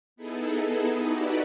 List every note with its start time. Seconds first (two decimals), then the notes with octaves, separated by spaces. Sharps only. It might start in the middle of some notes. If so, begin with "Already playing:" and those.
0.16 B3 D#4 E4 G#4 A4
1.00 D#4 E4 F#4 G4 B4 D5